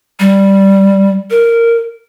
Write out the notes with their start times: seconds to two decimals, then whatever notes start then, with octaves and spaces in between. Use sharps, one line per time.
0.20 G3
1.31 A#4